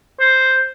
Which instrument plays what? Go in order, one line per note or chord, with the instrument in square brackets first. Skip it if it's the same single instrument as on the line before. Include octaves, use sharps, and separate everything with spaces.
[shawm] C5